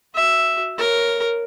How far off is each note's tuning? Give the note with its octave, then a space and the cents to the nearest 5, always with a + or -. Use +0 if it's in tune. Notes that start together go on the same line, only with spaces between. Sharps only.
F#4 +0 E5 +0
A#4 +0 C#5 +0